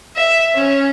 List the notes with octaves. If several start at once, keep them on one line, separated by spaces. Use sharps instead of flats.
E5
C#4